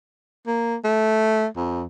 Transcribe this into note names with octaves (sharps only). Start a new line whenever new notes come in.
A#3
A3
F2